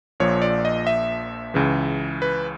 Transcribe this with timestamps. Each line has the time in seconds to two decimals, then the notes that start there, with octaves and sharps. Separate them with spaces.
0.20 A#1 A#2 F3 C#5
0.42 D5
0.65 D#5
0.87 E5
1.54 C#2 C#3 E3
2.22 B4